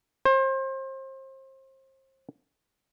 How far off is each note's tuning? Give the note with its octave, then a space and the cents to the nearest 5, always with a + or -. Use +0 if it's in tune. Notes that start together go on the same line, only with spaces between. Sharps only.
C5 +30